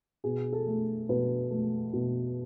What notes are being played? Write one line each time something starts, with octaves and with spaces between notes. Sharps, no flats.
B2 G#4
A4
A3
B2 B4
A3
B2